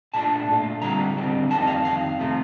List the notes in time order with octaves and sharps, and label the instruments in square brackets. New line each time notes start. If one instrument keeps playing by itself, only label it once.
[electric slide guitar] A#2 A3 D4 F4 A5
A#2 A3 D4 F4
D3 G3 C4 F4 A#5
D3 G3 C4 F4
F2 D#3 G3 A#3 A5
D#5
F5
F2 D#3 F5
C3 F3 A3